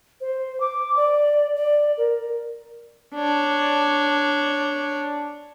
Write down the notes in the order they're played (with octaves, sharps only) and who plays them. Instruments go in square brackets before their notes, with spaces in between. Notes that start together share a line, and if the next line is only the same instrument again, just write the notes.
[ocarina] C5
D6
D5
D5
A#4
[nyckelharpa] D4 C#5